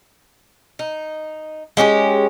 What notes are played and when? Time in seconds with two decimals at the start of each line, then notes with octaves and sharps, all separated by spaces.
0.79 D#4
1.77 G#3 C#4 F#4 G4